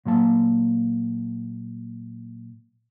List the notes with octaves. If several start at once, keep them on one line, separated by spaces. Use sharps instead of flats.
A#2 F#3 A#3 A5